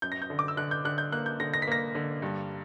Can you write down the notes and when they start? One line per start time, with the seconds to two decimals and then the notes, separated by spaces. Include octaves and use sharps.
0.02 F#2 G6
0.12 A#6
0.22 G6
0.30 D3
0.39 D6
0.48 E6
0.57 D3 F#6
0.71 G6
0.85 D3 F#6
0.98 G6
1.12 A#3 F#6
1.26 G6
1.40 D3 A#6
1.54 A#6
1.62 B6
1.67 A#3 A#6
1.95 D3
2.22 G2